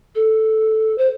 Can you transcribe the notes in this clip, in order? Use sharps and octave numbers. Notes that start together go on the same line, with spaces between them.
A4
C5